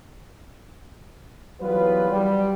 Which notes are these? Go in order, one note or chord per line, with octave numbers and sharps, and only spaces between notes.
E3 F#3 G3 B3 F4 B4
G3